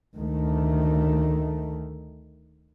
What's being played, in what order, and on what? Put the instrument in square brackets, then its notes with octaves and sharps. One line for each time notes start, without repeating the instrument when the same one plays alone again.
[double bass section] D2 D#3 A3